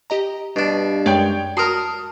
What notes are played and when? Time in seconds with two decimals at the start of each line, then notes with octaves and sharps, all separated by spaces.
0.10 G4 D#5 A#5
0.56 G2 B2 D4
1.06 F#2 G#3 C#5 D5 G5
1.57 F#4 A#4 A5 C6 D#6